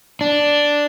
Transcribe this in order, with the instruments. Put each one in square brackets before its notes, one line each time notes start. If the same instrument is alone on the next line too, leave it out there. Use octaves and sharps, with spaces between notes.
[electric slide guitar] D4